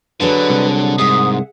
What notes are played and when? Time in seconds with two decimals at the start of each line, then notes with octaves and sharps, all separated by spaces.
0.21 D3 F#3 D4 G#4 B4
0.50 C2
0.98 G#2 G#4 E5 F#5 D#6